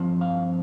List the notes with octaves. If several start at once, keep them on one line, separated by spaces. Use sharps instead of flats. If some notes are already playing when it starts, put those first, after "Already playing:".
Already playing: G2 F3 C4
F5